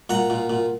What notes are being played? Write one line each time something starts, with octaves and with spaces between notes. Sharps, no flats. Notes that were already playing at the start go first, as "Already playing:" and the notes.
A#2 F#5 A#5
A#2
A#2